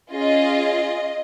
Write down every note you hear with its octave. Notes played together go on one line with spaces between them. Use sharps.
C#4 F4 G#4 D#5